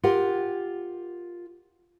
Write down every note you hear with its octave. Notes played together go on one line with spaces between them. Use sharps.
F4 G4 A#4 F#5